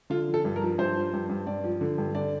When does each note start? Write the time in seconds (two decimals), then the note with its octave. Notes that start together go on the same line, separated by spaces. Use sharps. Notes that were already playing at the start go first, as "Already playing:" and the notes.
0.10 D3 F4
0.28 F3
0.34 A4
0.45 G2
0.56 A#4
0.62 F3
0.78 G2 C5
0.96 F3
1.13 G2
1.29 G2
1.47 G2 D5
1.64 F3
1.81 D3
1.98 G2
2.15 D3 D5